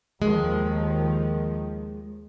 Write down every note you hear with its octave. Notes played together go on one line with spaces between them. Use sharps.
D#2 D#3 F3 G#3